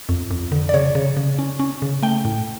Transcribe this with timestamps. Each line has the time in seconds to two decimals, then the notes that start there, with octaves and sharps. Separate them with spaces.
0.09 F2
0.31 F2
0.52 D3
0.69 D5
0.74 C#3 C#5
0.95 C#3
1.17 C#3
1.39 C#4
1.59 C#4
1.82 C#3
2.03 A3 G5
2.25 A2